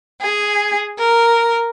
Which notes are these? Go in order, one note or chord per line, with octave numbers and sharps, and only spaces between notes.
G#4
A#4